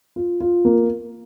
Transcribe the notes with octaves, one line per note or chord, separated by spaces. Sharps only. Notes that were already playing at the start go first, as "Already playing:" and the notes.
F4
F4
A#3